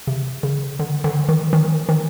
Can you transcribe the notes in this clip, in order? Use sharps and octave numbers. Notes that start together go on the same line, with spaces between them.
C3
C#3
D3
D3
D#3
D#3
D#3